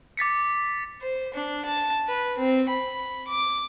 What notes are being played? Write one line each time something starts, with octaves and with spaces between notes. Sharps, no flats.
D6 A6 B6 C#7
C5
D4
A5
B4
C4
B5
D6